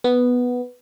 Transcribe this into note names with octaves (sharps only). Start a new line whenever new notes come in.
B3